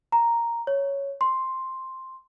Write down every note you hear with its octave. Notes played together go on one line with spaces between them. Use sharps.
A#5
C#5
C6